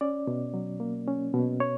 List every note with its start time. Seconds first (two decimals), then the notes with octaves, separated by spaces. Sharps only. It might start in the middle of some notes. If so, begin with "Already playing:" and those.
0.01 C#4 D5
0.27 B2
0.54 F#3
0.80 A#3
1.07 C#4
1.34 B2
1.60 C#5